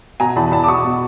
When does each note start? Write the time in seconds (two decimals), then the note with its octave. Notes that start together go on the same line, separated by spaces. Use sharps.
0.20 B2 G#5 A#5
0.36 E2 A5 B5
0.52 E2 A5 B5
0.64 D6
0.68 B2 C#6 D#6
0.84 B2